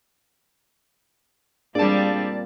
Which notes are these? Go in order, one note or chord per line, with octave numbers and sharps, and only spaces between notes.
A#2 G3 C4 D4 G#4 D5 A5